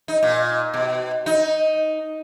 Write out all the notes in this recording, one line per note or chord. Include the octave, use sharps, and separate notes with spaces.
D#4
A#2
B2
D#4